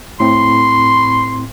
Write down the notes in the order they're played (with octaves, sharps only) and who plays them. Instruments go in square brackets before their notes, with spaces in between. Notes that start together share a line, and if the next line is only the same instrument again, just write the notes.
[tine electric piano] A2 C4 [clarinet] C6